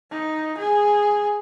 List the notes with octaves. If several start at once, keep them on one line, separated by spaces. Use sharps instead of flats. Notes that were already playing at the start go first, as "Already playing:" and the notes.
D#4
G#4